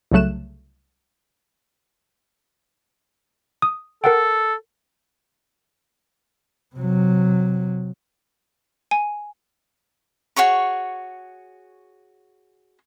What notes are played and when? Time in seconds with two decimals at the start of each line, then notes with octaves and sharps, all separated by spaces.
0.12 C2 C#3 F#3 A3 F#6 E7
3.62 D#6
4.04 A4 A#4 F#5 G5
6.75 C3 F#3
8.91 G#5
10.36 F#4 G#4 C#5 C#6